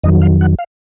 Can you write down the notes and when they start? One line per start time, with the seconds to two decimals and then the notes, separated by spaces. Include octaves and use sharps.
0.04 F2 D#3 F#3 D#5
0.22 F5
0.41 F#5
0.59 F5